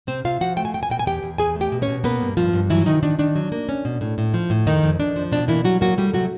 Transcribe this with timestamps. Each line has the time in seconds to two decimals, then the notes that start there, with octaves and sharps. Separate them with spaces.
0.07 C3 C4 C5
0.25 C3 F4 F5
0.41 F3 F#4 F#5
0.57 A3 G5
0.65 G#5
0.74 E2 G5
0.83 G#5
0.90 B2 G5
0.99 G#5
1.06 E2 G4 G5
1.23 E2
1.38 E2 G#4 G#5
1.55 A3
1.61 G4 G5
1.72 B2
1.82 C#4 C#5
1.88 B2
2.04 A#3 B3 B4
2.22 G2
2.37 G2 F3 F4
2.53 G2
2.70 E3 F#3 E4
2.86 C3 D#3 D#4
3.03 D#3 D4
3.19 D#3 D4
3.36 F#3
3.52 A#3
3.69 C#4
3.85 B2
4.01 A2
4.18 A2
4.34 F3
4.50 A2
4.67 F2 D#3 D#4
4.83 F2
5.00 F2 D4
5.16 F3
5.32 B2 D4
5.48 E3 A#3 E4
5.65 F#3 G3 F#4
5.81 F#3 A#3 F#4
5.98 G3 A3 G4
6.14 C3 F#3 F#4